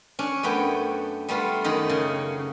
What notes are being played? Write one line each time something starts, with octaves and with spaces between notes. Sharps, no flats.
C#4 D4
F#2 A3 B3 G5
G3 A3 B3 F4
F#2 D#3 D#4 B5
C#3